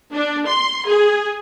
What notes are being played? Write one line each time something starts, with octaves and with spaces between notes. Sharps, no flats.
D4
C6
G#4